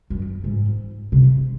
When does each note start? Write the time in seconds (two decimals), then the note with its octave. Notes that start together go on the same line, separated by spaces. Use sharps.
0.10 F#2
0.44 G#2
1.12 C3